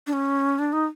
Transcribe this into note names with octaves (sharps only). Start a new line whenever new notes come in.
D4
C#4
D4
D#4